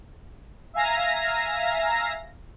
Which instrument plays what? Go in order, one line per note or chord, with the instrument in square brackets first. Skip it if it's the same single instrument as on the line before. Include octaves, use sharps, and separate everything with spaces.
[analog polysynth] E5 F5 G#5 A#5 A#6